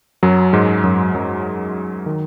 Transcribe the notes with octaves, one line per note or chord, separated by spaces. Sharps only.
F#2 F#3
G#2 G#3
F#2 F#3
F#2 F#3
D#3